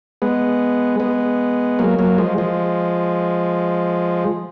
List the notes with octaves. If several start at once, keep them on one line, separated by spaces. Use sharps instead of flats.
G#3 B3
G#3 B3
F#3 A#3
F#3 A#3
F3 G#3
F3 G#3